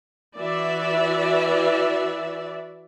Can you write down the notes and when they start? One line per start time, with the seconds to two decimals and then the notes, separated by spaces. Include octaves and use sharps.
0.37 E3 F#4 D5 E5